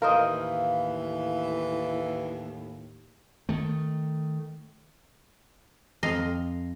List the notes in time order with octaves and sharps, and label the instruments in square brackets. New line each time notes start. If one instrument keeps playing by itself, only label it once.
[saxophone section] D#2 A2 [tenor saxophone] E3 [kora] A#4 C5 D#5 [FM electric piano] F5
[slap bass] D#3 A3
[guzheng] F2 D#5 A#5 C6